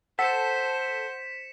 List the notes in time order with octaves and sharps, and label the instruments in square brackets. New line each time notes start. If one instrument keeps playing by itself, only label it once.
[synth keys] A4 [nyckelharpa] C5 [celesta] F#5 [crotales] B6 C#7 E7